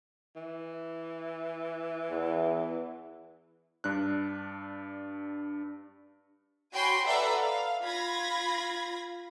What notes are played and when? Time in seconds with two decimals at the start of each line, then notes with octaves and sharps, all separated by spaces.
0.36 E3
2.11 E2
3.84 G2 D4 F#6
6.73 F#4 C#5 G5 G#5 B5 C6
7.06 A4 B4 D5 E5 F#5 A#5
7.41 F5
7.83 F4 B5 G#6 A#6